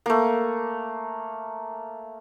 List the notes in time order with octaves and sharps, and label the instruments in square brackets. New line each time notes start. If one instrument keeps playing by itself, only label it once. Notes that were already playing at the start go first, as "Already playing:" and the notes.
[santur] A3 A#3